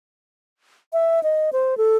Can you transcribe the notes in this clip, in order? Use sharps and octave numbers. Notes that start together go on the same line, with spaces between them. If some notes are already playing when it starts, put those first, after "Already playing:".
E5
D#5
C5
A4